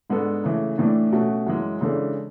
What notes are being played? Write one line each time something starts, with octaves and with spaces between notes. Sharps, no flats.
G#2 G#3 B3 D4 A4
C#3 E3 A3
A2 E3 A3 D4
B2 A3 C#4 F#4
F#2 E3 G#3
C#3 E3 G#3 D4 A4